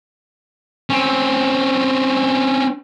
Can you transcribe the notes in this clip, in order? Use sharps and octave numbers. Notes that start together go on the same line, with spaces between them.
C4 C#4